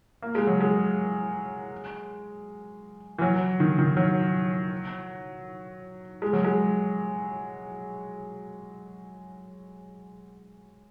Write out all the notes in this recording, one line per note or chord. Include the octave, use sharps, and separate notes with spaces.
A#3
G#3
F#3
G#3
E3
F#3
D#3
D#3
F#3
G#3
F#3
G#3